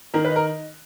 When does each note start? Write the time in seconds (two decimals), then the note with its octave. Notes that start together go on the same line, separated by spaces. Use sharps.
0.14 D#3 A#4
0.25 B4
0.30 D#4
0.36 A#4